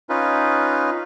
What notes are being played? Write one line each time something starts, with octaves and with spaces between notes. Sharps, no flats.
C#4 D#4 F4 B4